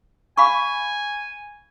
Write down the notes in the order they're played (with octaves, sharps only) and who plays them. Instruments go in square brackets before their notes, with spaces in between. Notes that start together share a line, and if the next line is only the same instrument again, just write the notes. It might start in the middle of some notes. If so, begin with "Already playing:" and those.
[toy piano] F5 B5 C#6 [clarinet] G#5